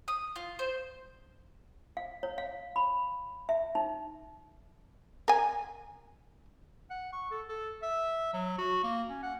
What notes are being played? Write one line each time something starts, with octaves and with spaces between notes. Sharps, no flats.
D#6
F4
C5
F5
C#5
F5
B5
E5
D#4
A#4 G#5
F#5
C#6
A4
A4
E5
F#3
F#4
A#3
C#4
F#5